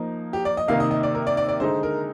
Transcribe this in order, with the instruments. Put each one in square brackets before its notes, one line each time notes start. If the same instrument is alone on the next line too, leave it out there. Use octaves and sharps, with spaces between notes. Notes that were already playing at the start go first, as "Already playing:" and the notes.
Already playing: [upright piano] F3 A#3 D#4
[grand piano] G4
D5
D#5
[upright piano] C3 D#3 A#3 D#4 [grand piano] F5
[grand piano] D#5
D#5
D5
A#4
D5
D5
D5
[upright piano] D3 G#3 D#4 [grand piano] C5
[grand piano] A#4